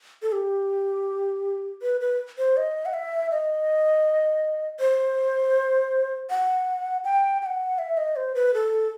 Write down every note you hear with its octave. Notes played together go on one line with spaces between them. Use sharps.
A4
G4
B4
B4
C5
D#5
F#5
E5
D#5
C5
F#5
G5
G5
F#5
E5
D#5
C5
B4
A4